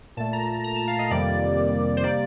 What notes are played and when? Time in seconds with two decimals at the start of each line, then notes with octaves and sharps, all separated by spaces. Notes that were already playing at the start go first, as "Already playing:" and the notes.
0.17 A#2 A3 A5
0.33 A#5
0.64 A#5
0.76 A5
0.88 F5
0.99 D#5
1.10 F2 C3 D#3 G3 A#3 D5
1.97 C5
2.04 C3 G3 A#3 D5